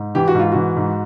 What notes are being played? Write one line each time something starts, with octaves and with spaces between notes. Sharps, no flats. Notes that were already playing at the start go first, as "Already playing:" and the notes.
Already playing: G#2
E3 G4
F#4
G#2 F4
E3 F#4
G#2